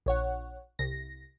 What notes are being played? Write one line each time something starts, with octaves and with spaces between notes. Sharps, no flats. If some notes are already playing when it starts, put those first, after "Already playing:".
A#1 C#5 F#5
C2 A#6